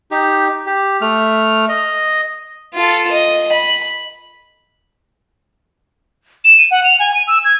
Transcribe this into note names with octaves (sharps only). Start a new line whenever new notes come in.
D#4 G4
G4
A3 F6
D#5
F4 A4
D#5
B5
E7
D#7
F#5
F7
G#5
D#7
E6
G#6